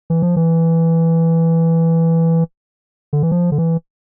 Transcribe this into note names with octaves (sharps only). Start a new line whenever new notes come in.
E3
F3
E3
D3
E3
F3
D3
E3